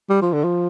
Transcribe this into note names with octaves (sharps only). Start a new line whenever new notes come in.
G3
F3
D3
F3